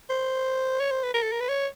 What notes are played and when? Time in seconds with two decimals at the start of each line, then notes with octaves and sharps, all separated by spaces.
0.10 C5
0.80 C#5
0.91 C5
1.03 B4
1.14 A#4
1.23 A4
1.32 A#4
1.40 B4
1.49 C#5